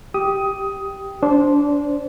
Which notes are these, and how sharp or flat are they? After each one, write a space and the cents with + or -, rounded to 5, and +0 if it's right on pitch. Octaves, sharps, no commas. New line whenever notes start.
G4 +0 G5 +0 D#6 +15
D4 -20 C5 +0